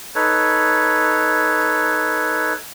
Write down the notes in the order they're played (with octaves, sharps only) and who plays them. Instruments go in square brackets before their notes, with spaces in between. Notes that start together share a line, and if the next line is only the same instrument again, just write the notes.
[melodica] D#4 A4 B4 C#5